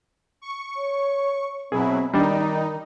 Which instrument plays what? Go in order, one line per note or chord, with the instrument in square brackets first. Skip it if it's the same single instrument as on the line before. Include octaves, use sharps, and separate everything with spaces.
[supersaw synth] C#6
[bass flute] C#5
[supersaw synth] B2 F#3 E4 [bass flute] C4 [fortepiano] G#4
[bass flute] D#3 [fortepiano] G3 D4 [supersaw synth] D#4